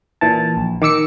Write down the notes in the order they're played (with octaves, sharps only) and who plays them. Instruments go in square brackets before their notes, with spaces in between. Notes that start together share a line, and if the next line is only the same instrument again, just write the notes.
[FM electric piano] A#2 E3 A5
A#1
D#3 D6 E6 C#7